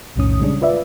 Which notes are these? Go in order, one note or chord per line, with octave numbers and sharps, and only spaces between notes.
B1 F2 A2 D#3 C#4 D#6
C#3 G3 G#3 C#4 D4
F4 B4 D5 E5